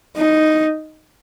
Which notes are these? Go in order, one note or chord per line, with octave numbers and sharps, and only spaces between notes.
D#4